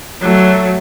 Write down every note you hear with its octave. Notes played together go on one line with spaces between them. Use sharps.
F#3 A3